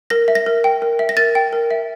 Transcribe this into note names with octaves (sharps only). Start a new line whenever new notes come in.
A#4 A#6
E5
A#6
A#4
G5
A#4
E5
A#6
A#4 A6
G5
A#4
E5